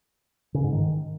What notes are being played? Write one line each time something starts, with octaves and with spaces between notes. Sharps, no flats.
C#3
G#2
D#3